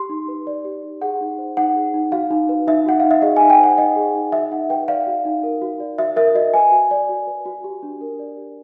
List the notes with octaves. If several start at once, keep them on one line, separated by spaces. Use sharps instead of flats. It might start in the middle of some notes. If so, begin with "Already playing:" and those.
Already playing: G4 C6
D#4
B4
D5
G4
D#4
G#4 F#5
D#4
C5
D#4 F#5
G#4
D#4
F#4 F5
D#4
B4
D#4 E5
F#4 F#5
D#4 F5
E5
G#4 D#5
D#4 G#5
G5
C5 F#5
D#4 D#5
G#4
D#4
F#4 E5
D#4 F#5
B4 G5
D5 F5
F#4
D#4
A#4
F#4
D5
F#4 E5
A#4 E5
F#4 D#5
B4 G#5
F#4
D5
F#4
B4
F#4
G4
D4
A#4
D5
G4